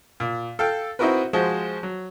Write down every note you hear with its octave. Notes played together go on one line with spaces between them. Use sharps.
A#2
A4 F5 G5
C4 D#4 E4 F#4 A#4 B4
F3 G#3 F#4 C5
F#3